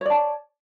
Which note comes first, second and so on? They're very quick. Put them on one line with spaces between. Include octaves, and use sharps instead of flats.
C#5 D5 A5